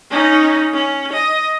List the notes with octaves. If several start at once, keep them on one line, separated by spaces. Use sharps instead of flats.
C#4 D#4
C#4
D#5